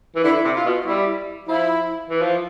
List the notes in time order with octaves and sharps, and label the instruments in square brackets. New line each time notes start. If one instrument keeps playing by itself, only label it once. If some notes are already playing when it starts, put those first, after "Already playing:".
[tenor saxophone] E3
[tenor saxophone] D3 [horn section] E4
[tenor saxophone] C3
[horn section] F4
[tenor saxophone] B2
[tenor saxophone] G3 [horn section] E4
[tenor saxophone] F3 [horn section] E4
[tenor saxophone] E3
F3